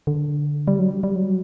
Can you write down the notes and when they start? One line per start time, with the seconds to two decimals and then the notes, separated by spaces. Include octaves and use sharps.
0.07 D3
0.68 G3
0.79 F#3
0.91 G3
1.03 G3
1.15 F#3